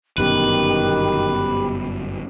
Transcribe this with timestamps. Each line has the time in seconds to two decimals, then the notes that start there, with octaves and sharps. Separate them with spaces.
0.18 G1 F#2 B2 D#3 G4 B4